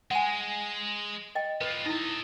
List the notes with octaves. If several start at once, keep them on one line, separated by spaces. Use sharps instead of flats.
G#3 F#5 G#5
D#5 G5
B3 F4 B4
D#4 E4 A4 D#5